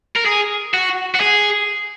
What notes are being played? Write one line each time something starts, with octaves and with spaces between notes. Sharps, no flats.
A#4
G#4
F#4
F#4
G#4